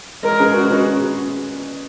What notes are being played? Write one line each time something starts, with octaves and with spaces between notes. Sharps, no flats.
G#3 A#4
C#4 G#4 B4
G#3 F#4
C#4 G#4 B4